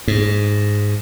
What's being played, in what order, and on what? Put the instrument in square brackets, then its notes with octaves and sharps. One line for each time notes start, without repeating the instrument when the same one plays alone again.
[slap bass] G#2